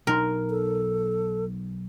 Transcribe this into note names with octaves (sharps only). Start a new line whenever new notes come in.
B1 D#4 A#4 C6
A4